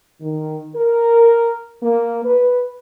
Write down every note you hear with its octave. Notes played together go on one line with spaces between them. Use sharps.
D#3
A#4
A#3
B4